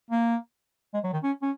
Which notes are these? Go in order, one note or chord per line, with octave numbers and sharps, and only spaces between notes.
A#3
G#3
F#3
D#3
C#4
C#4